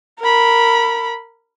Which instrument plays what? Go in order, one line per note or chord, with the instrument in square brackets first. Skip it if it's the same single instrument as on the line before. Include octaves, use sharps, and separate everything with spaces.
[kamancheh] A#4 B5